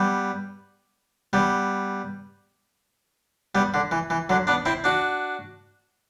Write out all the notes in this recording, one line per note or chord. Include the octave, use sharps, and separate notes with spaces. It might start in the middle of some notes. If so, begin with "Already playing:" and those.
Already playing: G3 B3
G3 B3
G3 B3
D3
E3
E3
D3 F#3
B3 D4
C4 E4
D4 F#4